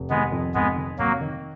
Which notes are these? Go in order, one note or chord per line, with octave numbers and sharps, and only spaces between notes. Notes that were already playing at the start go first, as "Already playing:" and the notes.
Already playing: F1
D#3 G#3 B3
F2
F1 G#3 B3
D#3
F1 F#3 A#3
D#3